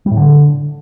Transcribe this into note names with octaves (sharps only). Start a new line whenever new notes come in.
G3
A2
D3